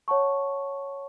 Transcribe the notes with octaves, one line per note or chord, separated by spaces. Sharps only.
C#5 F#5 A5 C#6